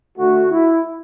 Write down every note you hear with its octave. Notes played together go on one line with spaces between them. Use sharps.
D3 A3 F#4
E4